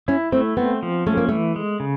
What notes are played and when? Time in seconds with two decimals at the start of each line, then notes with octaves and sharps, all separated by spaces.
0.08 C#4 E4
0.32 A3 C4
0.57 B3 C4
0.83 F3
1.07 A3 C#4
1.17 A#3
1.29 E3 A3
1.56 G#3
1.80 C#3